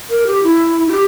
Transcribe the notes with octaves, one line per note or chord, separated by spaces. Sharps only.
A#4
G4
E4
E4
G4